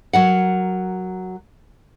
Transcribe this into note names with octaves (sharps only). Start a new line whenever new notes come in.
F#3 A#4 F#5